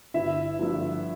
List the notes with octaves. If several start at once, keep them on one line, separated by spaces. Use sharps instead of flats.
G1 E4 E5
G2 D3 F3